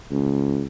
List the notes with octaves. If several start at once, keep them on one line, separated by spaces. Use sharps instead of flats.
C#2